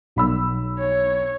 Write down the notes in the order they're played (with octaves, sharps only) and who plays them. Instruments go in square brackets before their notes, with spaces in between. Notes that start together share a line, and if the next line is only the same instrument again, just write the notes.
[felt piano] B1 B5 E6
[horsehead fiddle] C#5